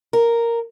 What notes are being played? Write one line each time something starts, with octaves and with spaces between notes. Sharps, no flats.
A#4